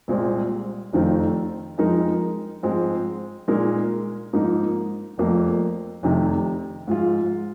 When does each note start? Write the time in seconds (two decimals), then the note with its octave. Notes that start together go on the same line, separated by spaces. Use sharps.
0.08 C2 A#2 G#3 C4
0.93 F1 F2 D#3 C4 F4
1.78 F2 F3 G#3 D#4 A#4
2.63 G#2 F3 G#3 C4
3.48 A#2 G#3 D#4 A#4
4.33 G#2 F3 A#3 D#4
5.18 F1 F2 F3 A#3
6.03 F1 F2 C3 D#3
6.88 G#2 F3 G#3 F4